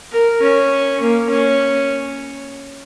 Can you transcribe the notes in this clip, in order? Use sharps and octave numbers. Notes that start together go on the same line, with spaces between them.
A#4
C#4
A#3
C#4